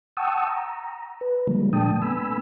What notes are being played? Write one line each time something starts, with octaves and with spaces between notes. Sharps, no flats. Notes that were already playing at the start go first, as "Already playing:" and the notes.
F#5 G5 A5 C#6 D#6 E6
A#5
B4
D3 F3 G3 G#3 A#3
A#2 A3 D4 G5 A5 D#6
A3 B3 G#5 B5 E6